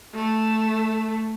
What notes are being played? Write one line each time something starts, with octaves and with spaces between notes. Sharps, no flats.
A3